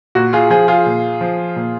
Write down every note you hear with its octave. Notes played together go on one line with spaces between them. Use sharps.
A#2 F#4
F4 G#4
F3 F4 G#4
F4 G#4
A#2
F3
A#2